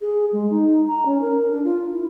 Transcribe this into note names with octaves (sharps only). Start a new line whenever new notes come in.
G#4
G#3
D#4
A#5
C#4
A#4
D4
F4
E4